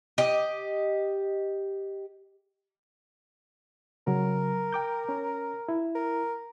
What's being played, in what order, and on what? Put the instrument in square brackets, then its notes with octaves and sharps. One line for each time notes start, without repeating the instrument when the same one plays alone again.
[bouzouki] G4 D#5
[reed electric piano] C#3 F#3 [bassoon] A#4
[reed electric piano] G5 D6 G6
C#4
E4
[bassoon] A#4